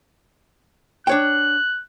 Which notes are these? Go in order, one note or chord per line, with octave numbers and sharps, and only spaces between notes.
D4 C#5 G5 F#6